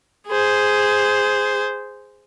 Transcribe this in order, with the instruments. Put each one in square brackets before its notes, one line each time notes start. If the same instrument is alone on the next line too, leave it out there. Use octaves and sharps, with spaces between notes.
[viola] G#4 C5